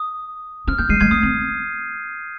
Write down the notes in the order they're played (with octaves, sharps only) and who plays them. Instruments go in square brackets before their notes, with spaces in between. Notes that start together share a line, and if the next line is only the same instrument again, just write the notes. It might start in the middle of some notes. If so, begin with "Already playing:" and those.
Already playing: [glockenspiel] D#6
[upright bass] C4 [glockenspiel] F6
[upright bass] A#3 [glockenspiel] G6
[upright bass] G#3 [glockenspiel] C7 D#7
[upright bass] G#3 [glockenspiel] G#6 C7
[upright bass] A#3 [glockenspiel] D#6
[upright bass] C4